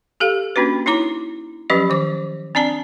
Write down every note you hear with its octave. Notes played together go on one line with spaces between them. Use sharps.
G4 A4 F5
A#3 C#4 D4 F#4 B4
D#4 E4 C#5 A#5 D6
F3 F#3 C#4 G4 B4 D#5
D#3 D6
C4 D4 D5 A5 A#5